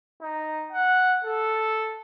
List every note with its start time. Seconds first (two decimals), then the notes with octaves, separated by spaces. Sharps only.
0.22 D#4
0.73 F#5
1.25 A4